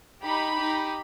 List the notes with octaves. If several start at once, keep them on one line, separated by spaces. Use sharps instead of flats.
D#4 G4 B5
D#4 G4